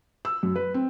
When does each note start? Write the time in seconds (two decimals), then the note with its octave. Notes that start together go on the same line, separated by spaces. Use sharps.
0.25 E6
0.43 F#2
0.56 B4
0.74 C4